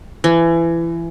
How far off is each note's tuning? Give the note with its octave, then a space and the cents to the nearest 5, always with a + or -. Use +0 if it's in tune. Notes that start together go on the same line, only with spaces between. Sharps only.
E3 +25